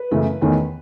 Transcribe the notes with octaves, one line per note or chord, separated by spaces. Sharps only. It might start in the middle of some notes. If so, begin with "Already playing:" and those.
Already playing: B4
F#2 C#3 E3 A3
E2 D#3 A3 C#4